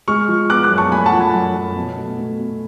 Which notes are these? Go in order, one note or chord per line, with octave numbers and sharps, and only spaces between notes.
G#3 C#6 F6
F3
B3 D6 F#6
D6 F#6
F#2
A5 C#6
A3 G#5 B5
F#5 A5
F3
G#5 B5
F#2
F#2
B2
A3
A3
B2